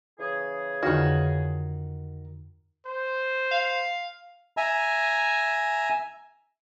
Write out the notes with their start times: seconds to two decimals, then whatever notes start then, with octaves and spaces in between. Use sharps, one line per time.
0.19 C#3 E3 G#4
0.83 F2 D3 D#3 F#4 F6
2.86 C5
3.51 F5
4.57 E5 G#5 A#5